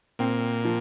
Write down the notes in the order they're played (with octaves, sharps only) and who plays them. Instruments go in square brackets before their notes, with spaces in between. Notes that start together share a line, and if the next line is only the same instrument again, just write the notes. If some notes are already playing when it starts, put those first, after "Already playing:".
[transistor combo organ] A#2 [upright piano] C4
[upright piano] F3